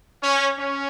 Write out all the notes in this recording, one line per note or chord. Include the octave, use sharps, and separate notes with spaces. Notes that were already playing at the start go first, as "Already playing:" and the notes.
C#4
C#4